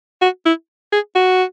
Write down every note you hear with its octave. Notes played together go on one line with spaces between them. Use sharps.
F#4
E4
G#4
F#4